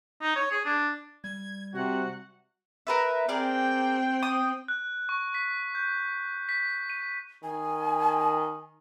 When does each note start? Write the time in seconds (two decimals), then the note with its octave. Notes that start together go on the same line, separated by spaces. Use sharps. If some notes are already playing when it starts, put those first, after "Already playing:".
0.21 D#4
0.36 C#5
0.51 G#4
0.66 D4
1.24 G3 G#6
1.75 C3 F#4 F#5
2.87 A#4 B4 E5
3.29 C4 G#4 A#4 D5 G5
4.23 D#6
4.68 F#6
5.09 C#6
5.34 B6
5.75 G6
6.49 B6
6.90 D#7
7.43 D#3 G#5